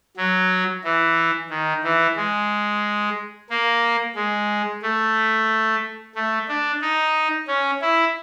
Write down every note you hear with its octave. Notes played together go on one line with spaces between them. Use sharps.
F#3
E3
D#3
E3
G#3
A#3
G#3
A3
A3
D4
D#4
C#4
E4